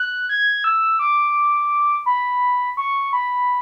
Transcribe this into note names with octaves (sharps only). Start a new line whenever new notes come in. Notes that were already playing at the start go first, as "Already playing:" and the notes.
Already playing: F#6
G#6
E6
D6
B5
C#6
B5